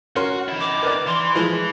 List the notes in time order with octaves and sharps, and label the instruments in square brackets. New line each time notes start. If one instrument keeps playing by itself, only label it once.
[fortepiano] C#4 A#4 C6 [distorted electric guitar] F#4
[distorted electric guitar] D#3 E4
[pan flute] D6
[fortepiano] A#4 B4 D5
[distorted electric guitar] E3 [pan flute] C6
[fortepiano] F3 G#3 [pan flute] E4